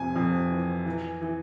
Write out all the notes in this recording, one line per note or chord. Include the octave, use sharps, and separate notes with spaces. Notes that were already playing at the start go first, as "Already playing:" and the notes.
Already playing: F2 C3 G#5
F2
E3
E3
E3